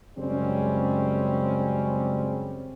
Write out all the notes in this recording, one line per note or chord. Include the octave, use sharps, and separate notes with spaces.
F#2 C#3 G3 G#3 C4 C#4